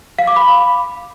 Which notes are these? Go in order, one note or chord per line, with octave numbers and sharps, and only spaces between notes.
F5
D6
B5